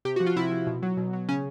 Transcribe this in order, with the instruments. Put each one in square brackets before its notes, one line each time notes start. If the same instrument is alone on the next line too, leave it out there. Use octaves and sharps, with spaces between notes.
[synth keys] C3 G4
F#4
F3
F4
C3 E4
F3
B2
F#3
B2
F#3
C#3 C#4